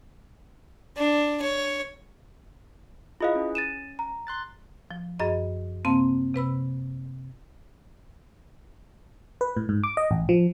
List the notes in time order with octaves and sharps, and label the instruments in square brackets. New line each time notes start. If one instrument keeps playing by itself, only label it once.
[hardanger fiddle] D4
C#5
[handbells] E4 G#4 B4 [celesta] F4 D#5 F5
[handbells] C#4
[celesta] A6 D#7 E7
A#5
[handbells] C6 F#6 A6
[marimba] F3
F#2 G#4 D#5 B5
C3 A#3 C4 F5 A5 C6
C3 B4 B5 E6
[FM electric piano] B4
A2
G#2
D6
D#5
A1
F3